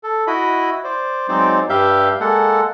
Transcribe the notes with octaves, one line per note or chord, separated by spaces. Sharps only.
A4
E4 F#4 D#5 B5
C5 D5
F#3 G#3 C4 D#4 C5 D5
G2 G3 G4 E5 F5 G6
G#3 A#3 A4 F#5